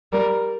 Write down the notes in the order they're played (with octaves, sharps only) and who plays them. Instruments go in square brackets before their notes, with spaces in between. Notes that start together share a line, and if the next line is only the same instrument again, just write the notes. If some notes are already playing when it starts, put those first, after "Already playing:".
[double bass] G3 [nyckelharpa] A#4